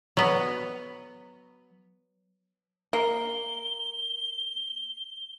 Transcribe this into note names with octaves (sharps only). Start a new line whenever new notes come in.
F#3 B3
A#3 G7